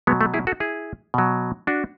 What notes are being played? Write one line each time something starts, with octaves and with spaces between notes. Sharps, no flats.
B2 F#3 G#3 B3
A3
E4 G#4
F#4 A4
E4 G#4
B2 F#3
D4 F#4